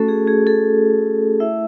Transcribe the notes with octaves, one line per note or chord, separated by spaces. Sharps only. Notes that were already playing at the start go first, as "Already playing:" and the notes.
Already playing: A3 C#4 F#4 A4
G#4
G#4
A4
A3 E4 E5